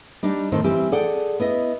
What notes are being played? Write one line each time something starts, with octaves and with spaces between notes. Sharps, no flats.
G3 D4 D#4
A2 D#3 C4 C5
E3 G3 C4 E4 G4
G#4 A4 D5 F#5 G5
B3 E4 D#5